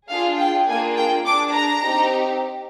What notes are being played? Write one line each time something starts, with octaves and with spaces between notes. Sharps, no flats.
D4 F4 G#4 F5
G5
A#3 D4 F4 G#4 G#5
G5
D4 G#4 D6
A#5
C4 D#4 G4